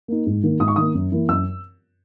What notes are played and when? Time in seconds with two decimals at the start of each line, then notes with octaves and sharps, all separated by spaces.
0.08 A#3 D#4
0.26 G#2
0.43 D#3 A#3
0.60 G#2 D#6
0.68 C#6
0.76 D#3 A#3 D#6
0.94 F#2
1.12 E3 A#3 E4
1.29 F#2 E6